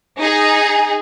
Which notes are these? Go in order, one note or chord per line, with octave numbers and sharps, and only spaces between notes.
D#4 G#4